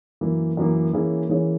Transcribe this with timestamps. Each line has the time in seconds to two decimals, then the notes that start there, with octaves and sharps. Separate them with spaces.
0.21 F#2 E3 A#3
0.57 F#2 E3 A#3
0.93 E3 A#3 C#4 G#4 C#5
1.29 E3 A#3 C#4 G#4 C#5